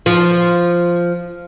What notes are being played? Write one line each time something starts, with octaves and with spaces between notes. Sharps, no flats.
F3